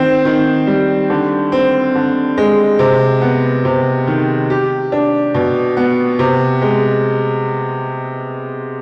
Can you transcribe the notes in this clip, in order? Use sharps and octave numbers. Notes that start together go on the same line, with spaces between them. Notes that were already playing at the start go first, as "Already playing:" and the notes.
Already playing: D#3 C4
D#3
G3
D3
C4
D3
G#3
C3
B3
C3
D#3
G4
D4
B2
B3
C3
G#3